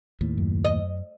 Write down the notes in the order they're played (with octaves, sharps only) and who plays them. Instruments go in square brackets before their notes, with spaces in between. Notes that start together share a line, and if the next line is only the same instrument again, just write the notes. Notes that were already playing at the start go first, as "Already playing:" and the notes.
[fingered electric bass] D#2 A2
[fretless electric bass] F#2
[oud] D#5